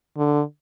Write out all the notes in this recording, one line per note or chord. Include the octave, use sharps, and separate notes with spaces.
D3